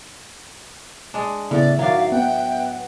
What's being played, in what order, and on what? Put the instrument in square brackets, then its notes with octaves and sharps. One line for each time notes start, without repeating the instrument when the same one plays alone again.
[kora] G#3 D4
[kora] A2 [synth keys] C#3 B3 [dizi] D5 [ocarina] E5
[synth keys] D#3 F#4 [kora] F#3 D5 [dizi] F5
[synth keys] B3 F#5 [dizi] G5